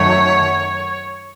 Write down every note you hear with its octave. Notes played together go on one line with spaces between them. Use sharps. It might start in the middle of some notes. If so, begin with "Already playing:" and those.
Already playing: F#2 D#3 F#3 A3 C#5